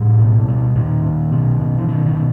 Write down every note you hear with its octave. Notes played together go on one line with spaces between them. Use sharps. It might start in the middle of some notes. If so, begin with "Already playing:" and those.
Already playing: A2 G3
B2
B2
A#2 D#3
A#2
B2
B2
E3
B2 D#3
D#3
B2